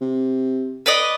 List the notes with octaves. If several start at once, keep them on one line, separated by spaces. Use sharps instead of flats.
C3
B4 D5 D#5